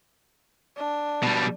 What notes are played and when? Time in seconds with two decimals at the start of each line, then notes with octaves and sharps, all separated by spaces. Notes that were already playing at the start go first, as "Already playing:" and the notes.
0.77 D4
1.23 B2 G3